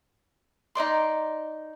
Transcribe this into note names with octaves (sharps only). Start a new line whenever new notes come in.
D#4 C5 D5 C6